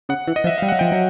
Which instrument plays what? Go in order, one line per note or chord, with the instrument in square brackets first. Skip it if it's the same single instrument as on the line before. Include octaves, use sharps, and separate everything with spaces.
[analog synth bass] C#3 [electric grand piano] F#5
[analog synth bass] E3
[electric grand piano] D#5
[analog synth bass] F3
[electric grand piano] E5
[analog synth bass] G3 [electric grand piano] F5
[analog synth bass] F#3 [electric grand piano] F#5
[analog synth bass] F3 [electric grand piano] G5
[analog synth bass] F#3